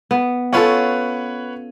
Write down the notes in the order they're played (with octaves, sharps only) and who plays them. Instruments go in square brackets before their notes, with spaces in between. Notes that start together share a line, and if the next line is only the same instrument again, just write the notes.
[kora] B3
[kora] C#4 F4 A4 [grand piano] B4 C#5 F#5